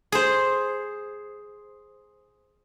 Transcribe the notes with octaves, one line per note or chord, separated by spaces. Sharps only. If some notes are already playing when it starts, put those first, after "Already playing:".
G#4 C5